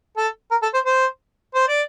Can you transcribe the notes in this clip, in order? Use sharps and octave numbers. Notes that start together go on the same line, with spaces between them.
A4
A#4
A4
C5
C5
C5
D5